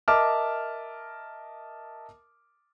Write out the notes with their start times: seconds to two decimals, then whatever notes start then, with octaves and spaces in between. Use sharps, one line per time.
0.08 A#4 D#5 E5 A5 D6 F6